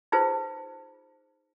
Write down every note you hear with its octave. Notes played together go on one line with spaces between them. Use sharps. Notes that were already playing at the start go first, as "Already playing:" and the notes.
D#4 F4 G#4 B4 C5